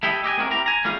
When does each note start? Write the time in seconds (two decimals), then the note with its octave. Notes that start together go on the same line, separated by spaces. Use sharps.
0.03 A3 E4 G4 A4 D#5
0.24 G4 D#5 G5 G#5
0.37 A3 C4 F#4 A4 A#4
0.51 E4 G4 A#5
0.66 G#5 A#5
0.84 G3 A3 C#4 F4 G#4 F5